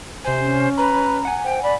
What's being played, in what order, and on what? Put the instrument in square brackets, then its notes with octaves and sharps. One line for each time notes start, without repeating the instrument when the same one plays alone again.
[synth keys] C3 G#5 [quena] C5
[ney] C#4
[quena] B4 [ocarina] A#5 [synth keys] B5
[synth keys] F#5 G#5
[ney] C5 [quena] G5
[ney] D5 [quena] B5